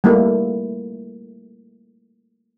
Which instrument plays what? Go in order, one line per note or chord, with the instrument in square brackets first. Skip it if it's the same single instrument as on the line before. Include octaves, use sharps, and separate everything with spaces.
[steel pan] G3 A3 A#3 E4